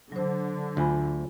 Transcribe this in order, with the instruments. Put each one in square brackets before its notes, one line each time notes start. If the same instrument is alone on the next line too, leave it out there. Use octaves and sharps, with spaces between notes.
[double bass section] D3 [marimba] F#3 C5
[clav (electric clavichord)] D2 [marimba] F4 G#5 B5